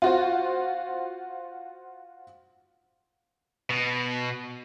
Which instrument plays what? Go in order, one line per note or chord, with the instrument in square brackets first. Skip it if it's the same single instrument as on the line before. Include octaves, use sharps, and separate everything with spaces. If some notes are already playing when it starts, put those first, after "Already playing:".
[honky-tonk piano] F4 F#4 C5
[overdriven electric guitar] B2